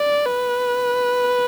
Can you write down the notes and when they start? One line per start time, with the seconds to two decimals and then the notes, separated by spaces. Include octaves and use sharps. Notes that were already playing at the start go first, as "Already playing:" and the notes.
Already playing: D5
0.26 B4